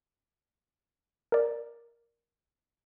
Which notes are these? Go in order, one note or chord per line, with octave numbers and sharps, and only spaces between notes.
A#4 D5